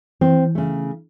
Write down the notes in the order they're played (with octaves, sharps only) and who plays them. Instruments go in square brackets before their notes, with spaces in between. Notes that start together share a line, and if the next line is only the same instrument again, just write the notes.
[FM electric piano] E3 [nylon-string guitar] C4
[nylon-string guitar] C#3 A3